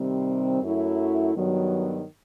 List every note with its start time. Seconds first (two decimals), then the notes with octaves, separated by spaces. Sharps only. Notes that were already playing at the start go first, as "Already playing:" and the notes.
Already playing: C3 D#3 G3 C4
0.62 F#2 F#3 A3 E4
1.33 G2 D#3 F#3 B3